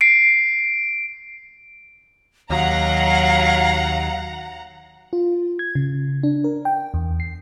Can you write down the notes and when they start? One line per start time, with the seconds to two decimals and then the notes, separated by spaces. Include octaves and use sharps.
0.01 C7 D7
2.50 D#2 F#3 F5 F#5 A#5
5.13 F4
5.59 G#6
5.75 C#3
6.23 D4
6.44 A#4
6.65 G5
6.94 E2
7.20 C7